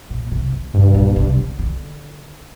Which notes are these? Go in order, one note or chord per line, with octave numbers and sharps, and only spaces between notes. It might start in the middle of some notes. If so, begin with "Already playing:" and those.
A#2
C3
D3
G2 C3
A#2
C3
D3
D3